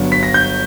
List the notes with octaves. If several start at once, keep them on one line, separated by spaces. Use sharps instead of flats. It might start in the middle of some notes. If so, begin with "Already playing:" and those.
Already playing: G1 G2 F#3
B6
A#6
G6